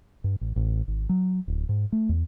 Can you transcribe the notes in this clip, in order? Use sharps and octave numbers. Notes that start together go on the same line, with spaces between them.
G2
A1
A1
G#1
F#3
D1
G#2
A3
E2